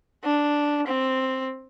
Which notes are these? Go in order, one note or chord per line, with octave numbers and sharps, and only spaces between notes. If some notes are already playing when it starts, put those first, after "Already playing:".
D4
C4